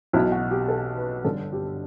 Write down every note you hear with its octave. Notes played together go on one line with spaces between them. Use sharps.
B1 B2 E4
F#4
G4
A4
B4
G1 G2 D3 A4
G4